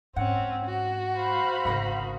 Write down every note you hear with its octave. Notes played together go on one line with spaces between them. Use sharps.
G#2 C4 C#4 F#5
F#4
C5 F5 B5
G#1 C#3 D#4 A#4 F#6